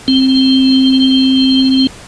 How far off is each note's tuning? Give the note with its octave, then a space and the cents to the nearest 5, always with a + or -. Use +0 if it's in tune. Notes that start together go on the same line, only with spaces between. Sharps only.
C4 +10